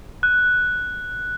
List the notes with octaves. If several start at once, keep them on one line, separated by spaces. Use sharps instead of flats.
F#6